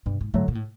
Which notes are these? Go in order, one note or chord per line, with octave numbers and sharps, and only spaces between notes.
G2 C3
G#2
G#2 D3 F#3 A3
A#2
A2